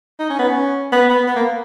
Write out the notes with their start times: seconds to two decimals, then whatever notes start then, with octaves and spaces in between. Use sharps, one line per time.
0.19 D#4
0.30 C#4
0.39 B3
0.49 C#4
0.92 B3
1.10 B3
1.28 B3
1.36 A#3